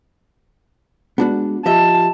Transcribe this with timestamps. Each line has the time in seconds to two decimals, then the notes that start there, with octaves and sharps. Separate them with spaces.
1.18 G#3 B3 D4 F#4 G#4
1.66 F3 F4 G4 D#5 E5 A5